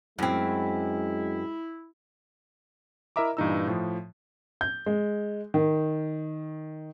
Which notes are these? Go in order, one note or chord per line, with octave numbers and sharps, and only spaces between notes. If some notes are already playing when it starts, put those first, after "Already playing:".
F#2 G#3 C4 E4
E4 A#4 D#5 E5 A#5 D6
G2 A#2 E3 D#4 A#5 E6
A2 F3
G6
G#3
D#3